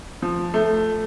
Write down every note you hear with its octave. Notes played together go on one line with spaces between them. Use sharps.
F3
A3